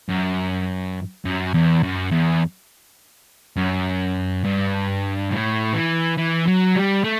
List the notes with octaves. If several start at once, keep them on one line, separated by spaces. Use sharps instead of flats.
F#2
F#2
E2
F#2
E2
F#2
G2
A2
E3
E3
F#3
G3
A3